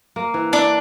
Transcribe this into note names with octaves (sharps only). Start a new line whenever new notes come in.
A#3
E3
D4 E4